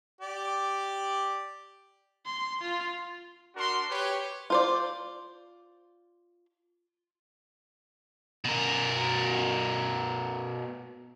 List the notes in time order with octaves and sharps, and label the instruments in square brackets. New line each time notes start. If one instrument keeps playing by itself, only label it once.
[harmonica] G4 D5
[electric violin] C6
F4
[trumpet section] D4 F#4 A#4 C6
G4 B4 C#5
[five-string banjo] F4 C5 D5
[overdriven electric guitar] B2 A#4